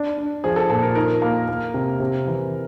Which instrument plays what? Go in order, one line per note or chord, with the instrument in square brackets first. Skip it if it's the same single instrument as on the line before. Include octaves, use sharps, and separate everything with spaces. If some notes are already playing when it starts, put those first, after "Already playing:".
Already playing: [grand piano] D4
D4
[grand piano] F3 [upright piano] G#4
[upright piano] A4
[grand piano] A#2 [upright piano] A4
[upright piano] A#4
[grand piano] D#4 [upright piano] A#4
[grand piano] A#3
A#3
C3
C3
E3